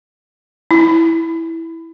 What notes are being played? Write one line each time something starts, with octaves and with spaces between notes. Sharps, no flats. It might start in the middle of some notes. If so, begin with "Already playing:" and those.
E4